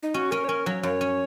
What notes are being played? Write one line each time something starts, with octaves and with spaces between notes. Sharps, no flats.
D#4
C#4 F#4
C#4 A#4
C#5
C#4 A#4
F#3 C#5
F#2 C#5
C#4